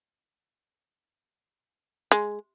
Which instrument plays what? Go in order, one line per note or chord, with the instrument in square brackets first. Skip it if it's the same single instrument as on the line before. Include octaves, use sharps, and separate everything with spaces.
[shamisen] G#3